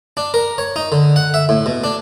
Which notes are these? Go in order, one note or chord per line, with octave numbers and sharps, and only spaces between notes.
D4
A#4
C#5
D#4
D3
F#5
E5
A2
B2
D4